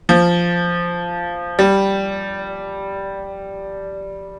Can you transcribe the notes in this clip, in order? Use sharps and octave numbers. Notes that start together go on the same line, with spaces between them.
F3
G3